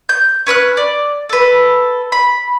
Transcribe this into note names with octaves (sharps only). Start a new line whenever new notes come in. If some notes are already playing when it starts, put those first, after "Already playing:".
G6
C#4 B4 E6 F#6
D5
A4 B4
B5